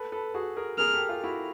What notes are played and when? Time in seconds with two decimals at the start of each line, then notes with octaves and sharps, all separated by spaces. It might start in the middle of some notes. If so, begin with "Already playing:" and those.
Already playing: A4 B4
0.12 A4 B4
0.34 F#4 G#4
0.56 G#4 A#4
0.78 G#4 A#4 F6
0.94 G4 A4
1.09 F4 G4
1.23 E4 F#4